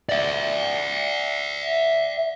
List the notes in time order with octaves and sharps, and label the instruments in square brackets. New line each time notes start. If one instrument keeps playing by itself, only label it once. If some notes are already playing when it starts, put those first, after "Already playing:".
[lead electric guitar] D5 E5